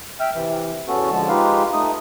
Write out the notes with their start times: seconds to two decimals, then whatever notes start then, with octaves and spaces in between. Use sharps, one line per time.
0.20 E5 G5 F6
0.34 C3 E3
0.88 E2 B3 C#4 F#4 A4
1.10 D3 F3 G#3 A5
1.29 G#3 D#4 F4 G4 B4 F5
1.73 A3 D#4 D#6